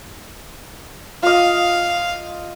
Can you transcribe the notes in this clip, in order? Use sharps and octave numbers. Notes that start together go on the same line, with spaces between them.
F4 D#5 F5